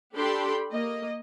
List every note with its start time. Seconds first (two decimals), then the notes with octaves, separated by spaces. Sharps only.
0.15 D4 G4 A4 G5 B5 C6
0.72 A#3 D#5